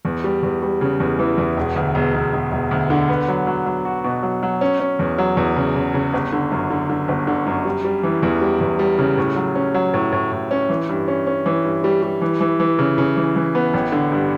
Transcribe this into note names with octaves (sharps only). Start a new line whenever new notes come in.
E2
G3
E2
G3
C#3
E2
E3
E2
E1
D2
E1
E1
E1
E1
D2
D3
B3
F#3
F#3
F#3
F#4
B2
F#3
F#3
C#4
C#4
E2
F#3
E2
C#3
C#3
C#3
G1
D3
F#2
D3
D3
G1
D3
F#2
G3
G3
E3
E2
G3
E2
G3
C#3
A2
F#3
C#4
F#3
A2
A2
A2
C#4
E3
G2
C#4
C#4
E3
G2
G3
G3
E3
E3
E3
C#3
C#3
E3
E3
B3
A1
D3
G2